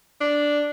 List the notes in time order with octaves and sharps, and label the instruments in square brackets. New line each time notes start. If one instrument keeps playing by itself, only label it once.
[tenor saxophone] D4